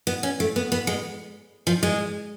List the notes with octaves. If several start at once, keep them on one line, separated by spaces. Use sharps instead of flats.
B3
C#4
A3
B3
B3
G#3
F3
G#3